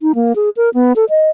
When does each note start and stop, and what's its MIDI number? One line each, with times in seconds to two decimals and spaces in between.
0.01 0.15 63
0.15 0.33 58
0.36 0.49 68
0.57 0.70 70
0.74 0.93 59
0.96 1.05 69
1.10 1.30 75